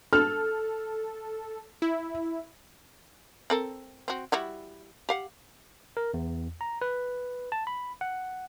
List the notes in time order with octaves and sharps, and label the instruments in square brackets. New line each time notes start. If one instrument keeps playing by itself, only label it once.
[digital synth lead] A4 [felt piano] F6
[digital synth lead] E4
[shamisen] C4 A4 A#4
C4 F#4
G3 E4 F#4
G4 F5 F#5
[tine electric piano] A#4
E2
A#5
B4
A5
B5
F#5